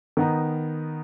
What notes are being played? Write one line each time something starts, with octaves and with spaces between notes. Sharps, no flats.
D#3 B3 D#4